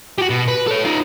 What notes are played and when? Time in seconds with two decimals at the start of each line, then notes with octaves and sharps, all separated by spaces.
0.18 F#4 G4
0.30 B2
0.48 B4
0.67 A4 C#5
0.85 D#4 F4